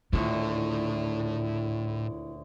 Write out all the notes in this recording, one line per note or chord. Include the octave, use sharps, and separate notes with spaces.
D#1 D2 A2 E4 F4